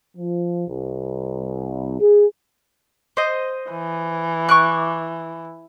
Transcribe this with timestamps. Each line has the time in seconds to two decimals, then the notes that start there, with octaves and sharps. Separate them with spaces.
0.17 F3
0.68 C2
2.00 G#4
3.17 C5 D#5
3.70 E3
4.49 C#6 D6 F#6